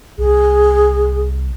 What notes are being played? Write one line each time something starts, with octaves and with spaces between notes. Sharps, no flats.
C2 G#4